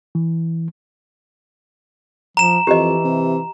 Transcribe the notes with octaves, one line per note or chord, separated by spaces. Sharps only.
E3
F3 A#5 E7
F2 E3 G4 D#5
C3